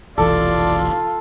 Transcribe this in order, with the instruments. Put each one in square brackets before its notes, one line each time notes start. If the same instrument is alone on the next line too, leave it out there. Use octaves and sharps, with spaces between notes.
[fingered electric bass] F1 B1 E3 [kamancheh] F4 [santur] A4 [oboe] D5